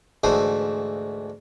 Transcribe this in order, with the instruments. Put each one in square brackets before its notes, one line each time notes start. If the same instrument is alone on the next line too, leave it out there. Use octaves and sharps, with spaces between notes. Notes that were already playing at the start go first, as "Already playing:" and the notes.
[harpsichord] D2 G#2 E3 A3 C5 D#6